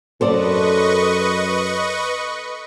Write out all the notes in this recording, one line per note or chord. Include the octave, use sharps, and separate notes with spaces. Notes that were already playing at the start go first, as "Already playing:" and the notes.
F#2 A4 B4 C5 D5 D#5 C#6